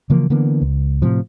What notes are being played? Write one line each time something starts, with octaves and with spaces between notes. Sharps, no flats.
C#3 E3 F3 A#3
D3 E3 A#3 B3
C#2
A2 C3 F3